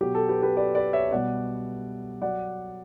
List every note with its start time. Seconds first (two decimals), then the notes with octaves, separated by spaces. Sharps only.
0.01 B2 F#3 G4
0.15 A4
0.29 G4 B4
0.42 G4 B4
0.57 B4 D5
0.75 B4 D5
0.93 C#5 E5
1.11 B2 G3 D5 F#5
2.22 F#3 D5 F#5